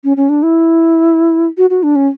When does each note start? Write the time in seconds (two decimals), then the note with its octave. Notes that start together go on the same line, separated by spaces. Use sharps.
0.04 C#4
0.17 C#4
0.29 D4
0.43 E4
1.58 F#4
1.70 F#4
1.83 D4
1.96 C#4